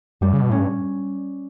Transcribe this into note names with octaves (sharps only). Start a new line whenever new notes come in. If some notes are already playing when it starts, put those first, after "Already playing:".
F#2 G3
C#3
B2
A2 C#4
G2